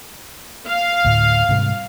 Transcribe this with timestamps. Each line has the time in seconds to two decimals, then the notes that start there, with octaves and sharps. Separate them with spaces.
0.67 F5
1.05 D2 A2
1.49 G#2 C3 G3